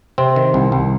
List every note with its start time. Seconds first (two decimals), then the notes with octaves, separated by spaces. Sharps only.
0.18 C3 C4
0.36 D#3
0.54 C2
0.72 C2